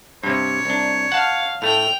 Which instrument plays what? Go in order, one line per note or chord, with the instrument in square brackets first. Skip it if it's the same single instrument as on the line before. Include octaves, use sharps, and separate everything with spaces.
[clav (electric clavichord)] G2 C3 [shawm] C#5
[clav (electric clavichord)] C2 D4
[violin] F5 [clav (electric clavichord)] F#5 A5
[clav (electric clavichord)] A2 A3 [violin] G5 F7